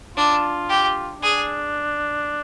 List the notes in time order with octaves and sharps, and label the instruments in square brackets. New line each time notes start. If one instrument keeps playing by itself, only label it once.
[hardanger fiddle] D4 [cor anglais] F4
[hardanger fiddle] G4
[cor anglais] D4 [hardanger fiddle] G#4